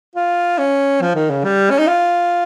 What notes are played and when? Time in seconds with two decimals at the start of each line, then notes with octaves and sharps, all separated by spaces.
0.16 F4
0.58 C#4
1.01 F3
1.15 D#3
1.30 C#3
1.44 G3
1.70 C#4
1.79 D#4
1.87 F4